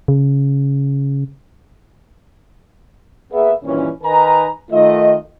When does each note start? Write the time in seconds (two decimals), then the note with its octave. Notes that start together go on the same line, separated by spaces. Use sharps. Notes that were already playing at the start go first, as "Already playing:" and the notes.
0.08 C#3
3.32 A#3 B3 G#4 E5
3.63 G2 A#2 D#3 E3 C#4
4.04 D#3 D#4 A#4 B4 G#5 A#5
4.71 D#3 A3 F4 D#5